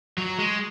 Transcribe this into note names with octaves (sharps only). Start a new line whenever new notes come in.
F#3
G#3